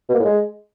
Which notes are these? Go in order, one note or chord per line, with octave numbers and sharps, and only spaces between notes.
B2
A#3
A2
G#3